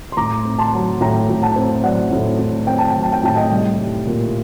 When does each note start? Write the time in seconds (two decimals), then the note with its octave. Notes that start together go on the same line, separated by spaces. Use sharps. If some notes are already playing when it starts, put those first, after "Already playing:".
0.12 C6
0.17 A2 A#5 D6
0.45 C4
0.59 A5 C6
0.73 F#3
1.01 A2 G5 A#5
1.29 A2
1.42 F#5 A5
1.56 C4
1.84 F#3 D5 F#5
2.11 A2
2.39 A2
2.67 C4 G5
2.78 A5
2.91 F#3 G5
3.03 A5
3.13 G5
3.23 A2 A5
3.36 D#5 G5
3.51 C2
3.79 G3
4.07 A#2